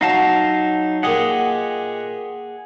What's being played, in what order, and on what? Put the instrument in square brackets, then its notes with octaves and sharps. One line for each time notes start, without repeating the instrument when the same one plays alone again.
[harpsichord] F#3 [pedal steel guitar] D#4 F5 A5
[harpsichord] A#2 G4 D#5 [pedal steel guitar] G#4 F#5